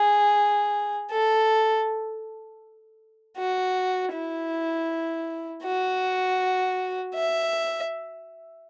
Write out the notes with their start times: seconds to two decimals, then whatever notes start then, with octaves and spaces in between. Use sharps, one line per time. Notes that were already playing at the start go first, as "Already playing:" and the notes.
Already playing: G#4
1.11 A4
3.37 F#4
4.13 E4
5.63 F#4
7.14 E5